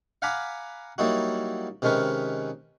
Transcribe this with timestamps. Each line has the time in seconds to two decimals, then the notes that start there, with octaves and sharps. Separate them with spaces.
0.22 F5 F#5 G#5 A#5 B5 D6
0.98 F#3 G3 A#3 D#4 E4 F#4
1.82 C3 D#3 G#3 C#4 A#4 B4